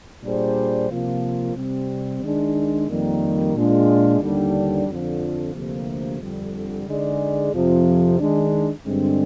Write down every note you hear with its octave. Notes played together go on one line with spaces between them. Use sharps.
A#2 G3 D4 G#4 C5
C3 F3 A#3 F4
C3 G3 C4
D#3 G#3 D4
F2 D#3 G3 A#3
A#2 G#3 D4 F4
D#2 D3 G3 D4
F2 D3 F3
D2 C3 F3 A#3
F2 D3 G3
D3 G#3 D#4 G#4 D5
F2 C3 F3
D#3 G#3 D4
G2 D3 G#3 C4